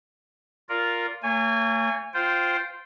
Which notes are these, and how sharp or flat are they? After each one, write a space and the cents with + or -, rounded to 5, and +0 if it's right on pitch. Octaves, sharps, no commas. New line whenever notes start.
F4 +0 A#4 +0 D5 -20
A3 +45 C#5 +0 G#5 -20
F4 +0 C5 -10 G5 -10